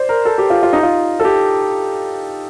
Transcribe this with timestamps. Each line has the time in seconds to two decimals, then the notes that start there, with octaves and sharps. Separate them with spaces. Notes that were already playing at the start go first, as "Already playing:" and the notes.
Already playing: C5 D5
0.09 A#4
0.25 A4
0.38 G4
0.50 F4
0.63 F4
0.73 D#4
0.83 F4
1.20 A4
1.25 G4